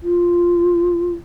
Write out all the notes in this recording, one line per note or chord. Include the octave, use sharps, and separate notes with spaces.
F4